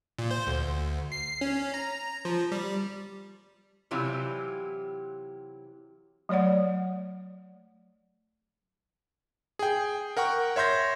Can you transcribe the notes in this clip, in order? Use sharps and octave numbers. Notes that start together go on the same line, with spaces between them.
A#2
C5
D2
C7
C#4
A#5
F3
G3
C3 E3 F#3 E4 F4 G4
F#3 A3 C#5 D5 F#5
G#4 G5
A#4 F#5 G5 C#6
C#5 E5 C6 G6 A#6